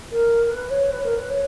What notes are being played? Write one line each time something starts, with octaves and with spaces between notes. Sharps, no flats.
A#4
B4
C#5
B4
A#4
B4
C#5